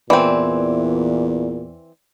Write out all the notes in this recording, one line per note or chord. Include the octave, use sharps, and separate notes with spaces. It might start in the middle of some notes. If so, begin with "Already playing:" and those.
E2 A#2 E3 C4 D5